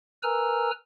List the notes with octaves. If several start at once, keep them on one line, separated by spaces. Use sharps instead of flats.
A#4 B4 G#5 A#5 E6 F6